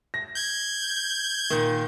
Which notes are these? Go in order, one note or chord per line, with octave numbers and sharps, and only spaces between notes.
A#6
G6 G#6
A#2 D#3